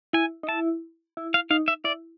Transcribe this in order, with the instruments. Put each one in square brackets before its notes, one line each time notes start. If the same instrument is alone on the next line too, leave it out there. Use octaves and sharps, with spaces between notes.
[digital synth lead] E4 [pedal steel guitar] G#5
[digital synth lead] D#4
[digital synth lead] E4 [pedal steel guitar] A5
[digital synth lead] E4
[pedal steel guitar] F5
[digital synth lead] D#4 [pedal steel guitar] F5
[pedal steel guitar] E5
[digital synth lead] E4 [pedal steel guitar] D5